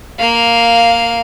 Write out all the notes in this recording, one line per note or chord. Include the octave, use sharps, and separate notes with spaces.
A#3 F5